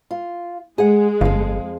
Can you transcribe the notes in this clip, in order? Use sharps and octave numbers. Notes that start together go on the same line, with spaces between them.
F4
G#3 G#4 F#5
G1 F2 F5